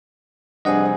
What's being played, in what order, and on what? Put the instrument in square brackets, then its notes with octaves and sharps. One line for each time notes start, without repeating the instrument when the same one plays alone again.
[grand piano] F1 C4 G#4 [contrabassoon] G2 [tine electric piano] D#5 F#5 D#6